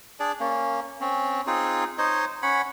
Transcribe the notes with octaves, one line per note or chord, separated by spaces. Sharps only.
D4 G#4 D5
A#3 C#4
C4 C#4
C4 D#4 F4 G#4
D#4 C5 C#5 D#5
C#4 C#5 F#5 B5